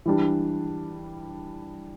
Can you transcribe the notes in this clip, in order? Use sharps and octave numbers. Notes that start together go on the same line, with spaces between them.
E3 G3 D4